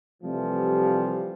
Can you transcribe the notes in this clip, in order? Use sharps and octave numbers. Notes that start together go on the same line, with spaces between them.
C3 E3 F3 G3 A3